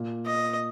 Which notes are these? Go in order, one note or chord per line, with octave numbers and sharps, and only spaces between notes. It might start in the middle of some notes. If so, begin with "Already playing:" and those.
Already playing: A#2
D#5